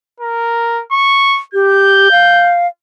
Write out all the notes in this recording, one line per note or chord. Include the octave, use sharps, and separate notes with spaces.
A#4
C#6
G4 G6
F5